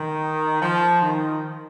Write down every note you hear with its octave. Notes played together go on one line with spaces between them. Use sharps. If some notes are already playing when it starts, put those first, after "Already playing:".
Already playing: D#3
F3
D#3